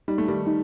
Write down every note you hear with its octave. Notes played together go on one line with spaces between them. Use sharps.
G3 D#4
A3
D#3 G3
D#4